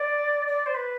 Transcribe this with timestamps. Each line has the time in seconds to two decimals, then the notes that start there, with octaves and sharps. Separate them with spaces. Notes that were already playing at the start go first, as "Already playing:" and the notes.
Already playing: D5
0.47 D5
0.65 C5
0.74 B4